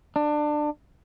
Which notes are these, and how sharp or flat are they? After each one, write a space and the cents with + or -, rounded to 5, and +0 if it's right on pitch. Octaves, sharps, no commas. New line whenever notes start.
D4 +25